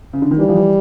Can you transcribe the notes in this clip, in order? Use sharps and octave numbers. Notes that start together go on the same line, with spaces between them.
C#3
D3
D#3
E3 G3
F3
E3